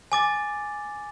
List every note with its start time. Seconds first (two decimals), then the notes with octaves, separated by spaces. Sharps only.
0.12 G#5 D6 A6